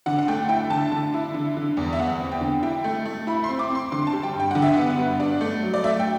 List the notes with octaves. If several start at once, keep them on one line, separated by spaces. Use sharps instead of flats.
D3 F#5
F#5
A3 G5
E4 G5
D3 A5
D3
E4
D3
D3
E2
E5
E2 F#5
C4
G5
D3
E4 G5
A3
A3
E4 B5
C6
C4
D6
C4
C6
D3 C6
A5
G3
G5
G2
G5
D3 F#5
E5
B3 F#5
G2
D4
A3
F#3
D5
A3 E5
G5